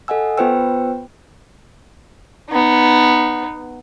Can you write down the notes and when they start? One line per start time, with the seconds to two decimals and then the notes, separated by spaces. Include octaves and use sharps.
0.08 A4 D#5 F#5 G#5 E6
0.38 B3 F4 B4 C5 G5 E6
2.51 B3 D#4